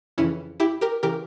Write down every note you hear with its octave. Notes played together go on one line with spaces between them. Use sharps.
F2 C#3 E3 C#4 E4
E4 G4
G4 A#4
C#3 E3 G4 A#4